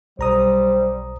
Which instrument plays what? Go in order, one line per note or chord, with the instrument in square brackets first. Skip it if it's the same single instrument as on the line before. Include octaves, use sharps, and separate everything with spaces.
[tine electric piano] B1 A#5 D#6 [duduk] G3 [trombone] C5